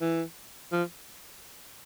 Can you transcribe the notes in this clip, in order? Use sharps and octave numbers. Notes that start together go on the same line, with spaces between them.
E3
F3